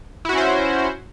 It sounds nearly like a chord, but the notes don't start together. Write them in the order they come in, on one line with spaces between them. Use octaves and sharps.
E4 F#4 C#4 C5